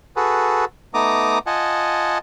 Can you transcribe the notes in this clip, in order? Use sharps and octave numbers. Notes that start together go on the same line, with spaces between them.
F#4 G#4 A4 B4
A3 B3 D#4 A#5 D6 D#6
F4 D#5 F#5 G#5 A5